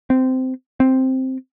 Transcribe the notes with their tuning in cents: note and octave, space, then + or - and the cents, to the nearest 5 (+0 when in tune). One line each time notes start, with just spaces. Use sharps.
C4 -15
C4 +0